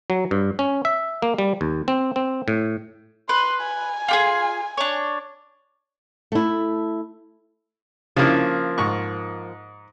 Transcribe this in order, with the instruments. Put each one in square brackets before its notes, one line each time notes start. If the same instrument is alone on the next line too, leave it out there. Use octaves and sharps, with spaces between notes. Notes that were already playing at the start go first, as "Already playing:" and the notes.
[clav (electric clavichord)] F#3
G2
C#4
E5
A#3
G3
D#2
C4
C4
A2
[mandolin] B4 [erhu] C6
[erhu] G#5
[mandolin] F4 G4 G#4
D4 C#5
[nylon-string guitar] A3 E4
[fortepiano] C#3 D4 E4 [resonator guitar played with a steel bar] F3 A#3
[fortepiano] G#2 C#6